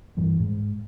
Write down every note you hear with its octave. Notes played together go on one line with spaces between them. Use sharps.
G2 E3 G3
G#2